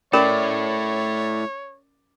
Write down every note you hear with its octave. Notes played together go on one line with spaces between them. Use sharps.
A3 C#4 E4 A#4 C#5 D5 B5